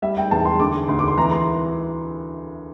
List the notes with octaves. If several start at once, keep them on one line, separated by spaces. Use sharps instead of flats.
G3 E5
G5
E2 A5
C6
D3 D6
D2 C6
D6
C6
E3 A#5
C6